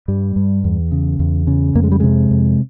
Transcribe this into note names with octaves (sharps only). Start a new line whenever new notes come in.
G2 G3
G2
E2
C#3
E2
C#3
F2 A#3
G#3
G3
C3 G#3
F2